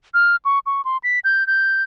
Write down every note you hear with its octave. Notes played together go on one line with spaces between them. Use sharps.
F6
C#6
C#6
C6
B6
G6
G6